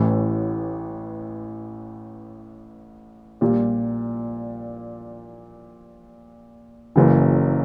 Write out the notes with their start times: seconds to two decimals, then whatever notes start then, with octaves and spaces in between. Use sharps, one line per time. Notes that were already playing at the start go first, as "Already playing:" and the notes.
Already playing: A1 A2 E3
3.41 A#1 A#2 G3
6.96 F#1 F#2 C#3 E3